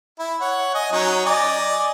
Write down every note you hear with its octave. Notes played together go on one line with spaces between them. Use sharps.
E4
C#5 F#5
D#5 G#5
F#3 C#4 D#4
D5 D#5 G#5